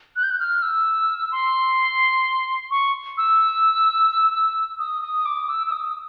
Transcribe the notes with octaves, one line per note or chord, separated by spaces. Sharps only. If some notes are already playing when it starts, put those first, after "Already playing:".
F#6
G6
F#6
F6
E6
C6
C#6
E6
D#6
D#6
D6
E6
E6
D#6